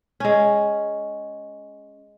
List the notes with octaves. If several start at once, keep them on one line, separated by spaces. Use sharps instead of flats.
G#3 C#4